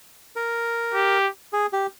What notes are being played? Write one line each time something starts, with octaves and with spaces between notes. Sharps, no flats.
A#4
G4
G#4
G4